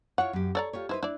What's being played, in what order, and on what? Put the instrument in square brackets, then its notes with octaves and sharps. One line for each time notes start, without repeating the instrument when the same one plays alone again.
[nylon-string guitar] E4 F4 C#5 [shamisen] F#5
[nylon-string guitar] F#2 G4
[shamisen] A4 D5 A#5 [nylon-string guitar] C#5
[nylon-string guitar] F4 G4 C#5
[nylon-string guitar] D#4 B4 [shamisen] E4 C5
[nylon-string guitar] D4 [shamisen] E4 D5